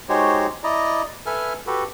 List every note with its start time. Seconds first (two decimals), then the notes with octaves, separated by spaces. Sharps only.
0.09 G#3 D#4 F#4 G4 C5 C#5
0.64 E4 D5 D#5 A#5
1.26 A4 B4 E5 G#5 F6
1.67 F#4 G4 A4 B4